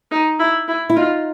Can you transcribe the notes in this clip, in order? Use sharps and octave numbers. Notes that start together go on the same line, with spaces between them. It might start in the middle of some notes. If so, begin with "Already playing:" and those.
D#4
E4
E4
E4
D#4 F4